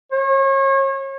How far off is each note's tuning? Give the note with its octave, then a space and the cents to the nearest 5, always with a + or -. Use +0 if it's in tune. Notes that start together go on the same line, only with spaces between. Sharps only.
C#5 -35